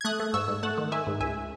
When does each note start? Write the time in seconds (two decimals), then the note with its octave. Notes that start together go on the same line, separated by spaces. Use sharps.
0.01 G#6
0.05 A3 D#6 F#6
0.20 A3
0.34 G#2 C#6 E6
0.48 G#2
0.63 A3 F#5 A5
0.78 D#3
0.92 D#3 E5 G#5
1.07 G#2
1.20 C#2 E5 G#5